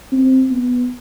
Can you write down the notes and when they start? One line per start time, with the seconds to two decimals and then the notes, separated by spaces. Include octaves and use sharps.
0.12 C4
0.50 B3